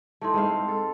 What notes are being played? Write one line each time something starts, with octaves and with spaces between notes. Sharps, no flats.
A3 D#4 E4 A5 C6
G#3 C4 F5
A4